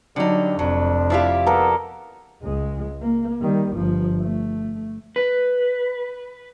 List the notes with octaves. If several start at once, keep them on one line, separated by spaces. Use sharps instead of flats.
D3 F#3 G3 D#4
F1 F2 F#3 D4
F3 E4 G4 D5 E5 F5
B3 A4 A#4
C#2 G#3
A#3
D#3 G3
G1 F3
A3
B4